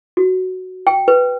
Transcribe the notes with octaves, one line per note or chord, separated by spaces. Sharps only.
F#4
G5
B4